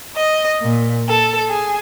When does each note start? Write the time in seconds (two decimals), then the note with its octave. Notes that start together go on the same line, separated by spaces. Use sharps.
0.16 D#5
0.61 A#2
1.09 A4
1.49 G#4